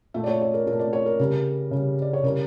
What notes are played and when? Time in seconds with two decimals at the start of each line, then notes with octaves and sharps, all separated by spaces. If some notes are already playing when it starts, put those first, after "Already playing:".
0.14 A#2 A3 E5
0.24 D5
0.27 C#5
0.41 C#5
0.54 A#4
0.66 A#2 A3 A#4
0.79 D5
0.93 C#5
1.06 A#4
1.19 C#3 G3 A#4
1.71 C#3 G3
2.02 D5
2.13 C#5
2.24 C#3 G3 A#4